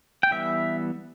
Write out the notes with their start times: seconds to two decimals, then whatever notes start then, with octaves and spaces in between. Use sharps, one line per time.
0.23 G5
0.31 E3 G3 B3 E5